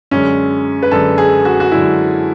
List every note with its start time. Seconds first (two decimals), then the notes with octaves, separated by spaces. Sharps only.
0.11 F#2 D3 G#3 C#4
0.83 B4
0.91 F#2 D3 G#3 A4
1.18 G#4
1.45 F#4
1.60 F#4
1.72 F#2 D3 G#3 E4